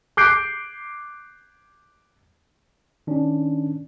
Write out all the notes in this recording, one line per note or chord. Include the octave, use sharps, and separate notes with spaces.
D6 F#6 G6 C7 D7
D#3 C#4 D4